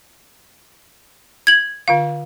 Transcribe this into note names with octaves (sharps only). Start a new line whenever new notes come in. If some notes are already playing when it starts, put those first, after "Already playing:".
G#6 F#7
D3 F4 F5